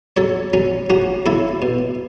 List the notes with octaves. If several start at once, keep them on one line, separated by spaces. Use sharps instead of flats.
F#3 A4 C#5
F#3 C#4
F#3 C#4 F#4
F#3 E4 A4
B2